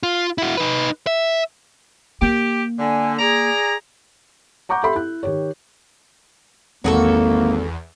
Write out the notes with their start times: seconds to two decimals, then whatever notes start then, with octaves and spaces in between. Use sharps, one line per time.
0.03 F4
0.38 E4 F#4
0.57 D#4 B4
1.07 E5
2.22 A#3 G4
2.79 D3 G#5
3.19 G#4 D5 A#5
4.69 F#5 A#5 C#6 D6 G6
4.83 G4 A4 E5 B5 C6
4.95 E4 F#6
5.23 D#3 G4 C#5
6.84 G#1 E2 A#3 F#4 G#4 A4